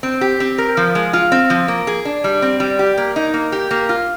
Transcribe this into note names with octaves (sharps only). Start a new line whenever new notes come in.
C4
G4
C4
A#4
F3
G#3
F4
C4
F3
A#3
G#4
D4
G3
C4
G3
G4
A#3
D#4
A#3
G4
A#3
F4